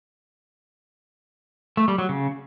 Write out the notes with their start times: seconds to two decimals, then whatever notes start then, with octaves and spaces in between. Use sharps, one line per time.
1.77 A3
1.88 G3
1.98 F#3
2.09 C#3